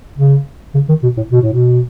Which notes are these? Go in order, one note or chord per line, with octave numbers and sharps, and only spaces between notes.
C#3
C#3
D#3
B2
A2
B2
A2
B2